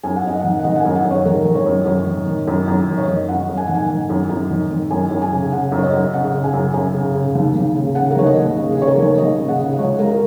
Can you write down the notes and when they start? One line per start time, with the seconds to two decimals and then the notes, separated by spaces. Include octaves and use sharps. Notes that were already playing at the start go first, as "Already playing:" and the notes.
0.03 F#2 G#5
0.16 F#5
0.24 F#2 D#5
0.39 D#3 F#5
0.59 F#5
0.64 D#3 D#5
0.76 F#5
0.80 F#2 G#5
0.95 F#5
1.05 F#2
1.11 C#5
1.25 D#3 A#4
1.45 D#3
1.55 C#5
1.66 F#2
1.86 F#2
2.07 D#3
2.27 D#3
2.47 F#2
2.68 F#2
2.88 D#3
2.98 C#5
3.08 D#3 D#5
3.28 F#2 F#5
3.49 F#2
3.57 G#5
3.66 D#3 F#5
3.75 G#5
3.90 D#3
4.10 F#2
4.30 F#2
4.51 D#3
4.71 D#3
4.90 F#2 G#5
5.11 F#2
5.22 G#5
5.31 C#3
5.52 C#3 F#5
5.72 F#2
5.78 C#5
5.83 D#5
5.93 F#2
6.13 C#3 F#5
6.34 C#3
6.43 G#5
6.53 F#2
6.74 F#2 G#5
6.94 C#3
7.15 C#3
7.35 D#2
7.55 D#2
7.76 C#3
7.95 C#3 F#5
8.11 A#4
8.16 D#2 C#5
8.26 D#5
8.37 D#2
8.56 C#3
8.72 G#4
8.78 C#3 C#5
8.88 A#4
8.97 D#2 C#5
9.18 D#2 D#5
9.38 C#3
9.48 F#5
9.58 C#3
9.73 D#5
9.79 C#2 C#5
9.99 C#2 A#4
10.09 A#4